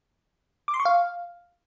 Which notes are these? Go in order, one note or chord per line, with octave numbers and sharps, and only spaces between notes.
D6
C6
C#6
F5